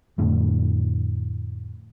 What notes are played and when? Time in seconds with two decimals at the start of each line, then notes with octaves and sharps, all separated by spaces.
0.18 F2 A2 D3